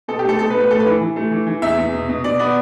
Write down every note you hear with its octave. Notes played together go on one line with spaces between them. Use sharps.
B2 A4
G4
A3 A4
B2 A4
B4
A3
B4
A2 A4
B4
E3
E3
A3
E3
E3
E2 E5
E2
B2
B2
B2 D5
B3 D5